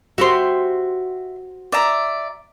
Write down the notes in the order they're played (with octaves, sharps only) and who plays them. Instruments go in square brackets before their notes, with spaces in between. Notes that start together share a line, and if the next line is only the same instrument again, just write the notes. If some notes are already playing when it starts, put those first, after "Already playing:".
[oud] F#4 G4 C5 [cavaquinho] E5 C6
[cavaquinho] D5 E5 A#5